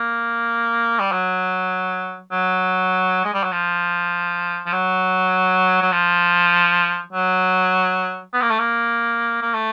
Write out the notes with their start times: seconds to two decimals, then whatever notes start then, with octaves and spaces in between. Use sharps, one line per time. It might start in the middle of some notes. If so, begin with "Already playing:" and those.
Already playing: A#3
0.99 G3
1.12 F#3
2.32 F#3
3.25 G#3
3.34 G3
3.43 F#3
3.52 F3
4.66 F3
4.72 F#3
5.82 F#3
5.92 F3
7.13 F#3
8.33 B3
8.42 A#3
8.50 A3
8.59 A#3
9.42 A#3
9.53 A3